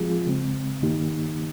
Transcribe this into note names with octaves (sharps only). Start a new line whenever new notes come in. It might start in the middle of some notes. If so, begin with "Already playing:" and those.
Already playing: F3 G#3 C4 F4 G#4
C#3 G#3 C4
G2 D#3 A#3 D#4 G4